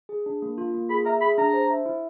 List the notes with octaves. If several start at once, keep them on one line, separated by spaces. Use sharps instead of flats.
G#4
D4
A#3
F4
A#3
G#4 B5
E5 A#5
G#4 B5
D4 A#5
C5
E5
E4